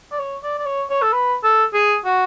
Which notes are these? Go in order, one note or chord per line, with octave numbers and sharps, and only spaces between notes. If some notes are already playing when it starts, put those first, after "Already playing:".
D5
C#5
D5
D5
C#5
C#5
A4
B4
A4
G#4
F#4